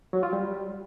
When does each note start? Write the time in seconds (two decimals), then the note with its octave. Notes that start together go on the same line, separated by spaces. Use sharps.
0.13 F#3
0.23 F4
0.33 G3